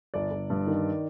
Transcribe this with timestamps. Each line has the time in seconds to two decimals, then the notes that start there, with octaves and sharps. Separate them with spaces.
0.14 G1 D5
0.31 G1
0.50 G2
0.67 D#3